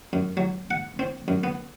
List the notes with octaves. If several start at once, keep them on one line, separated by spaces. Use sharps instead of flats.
F#2
F#3
F#5
C4
F#2
B3